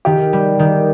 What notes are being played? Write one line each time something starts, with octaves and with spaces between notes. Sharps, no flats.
D#3 G4
G3
D#3